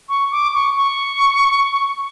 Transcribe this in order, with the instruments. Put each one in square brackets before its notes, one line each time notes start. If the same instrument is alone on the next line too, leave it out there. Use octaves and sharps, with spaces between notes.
[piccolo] C#6
D6
C#6
C#6